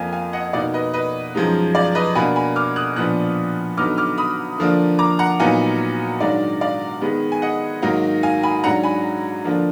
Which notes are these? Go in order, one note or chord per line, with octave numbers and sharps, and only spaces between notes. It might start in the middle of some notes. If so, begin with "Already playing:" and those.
Already playing: F2 F3 A#3 F5 G#5
F5 G#5
D#5 F#5
B2 A#3 D#4 D5 F5
B4 D#5
B4 D#5
F#2 F3 G#3 D#4
D5 F5
B4 D#5
B2 A#3 D4 G#5 B5
G#5 B5
D6 F6
D#6 F#6
A#2 F3 B3 D4 D#6 F#6
D3 F#3 B3 D#4 D6 F6
D6 F6
B5 D#6
D3 F3 A#3 D4
A#5 D6
F#5 A#5
A#2 F#3 B3 D#4 F5 G#5
G#2 D#3 F#3 D4 D5 F5
D5 F5
D#3 G#3 B3
G#5
D#5 F#5
G#2 D#3 F#3 A#3 D#4
F5 G#5
G#5 B5
G#2 F#3 D4 F#5 A#5
G#5 B5
D3 F3 A#3 D4